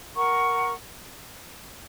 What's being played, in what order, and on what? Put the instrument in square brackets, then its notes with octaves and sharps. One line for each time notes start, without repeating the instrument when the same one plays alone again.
[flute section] A#4 F#5 A#5 C#6